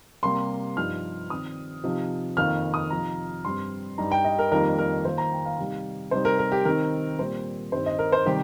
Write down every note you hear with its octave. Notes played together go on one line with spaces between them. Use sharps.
C3 G3 A#3 C6
G2 F3 D#4 F6
D#3 C4 F4 D#6
C3 F3 D#4
F2 D#3 A#3 F4 F6
D#6
C3 F3 D#4 A#5
G2 G3 C4 C6
G2 G3 D#4 A#5
G5
D#5
A#4
F2 D#3 G3 A#3 D#4 A#4
A#4
D#3 A#3 F4 C5
A#5
G5
F5
C3 G3 D#4
C3 G3 D#4 C5
A#4
A#4
G4
D#3 C4 D#4 A#4
A#2 G3 C4 C5
G2 D#3 C4 D#4 C5
D#5
A#4
C5
C3 D#3 G3 G4